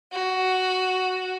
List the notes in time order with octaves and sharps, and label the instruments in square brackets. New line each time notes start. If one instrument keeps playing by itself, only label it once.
[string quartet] F#4